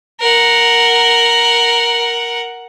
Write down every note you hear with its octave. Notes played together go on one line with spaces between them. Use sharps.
A#4 F#5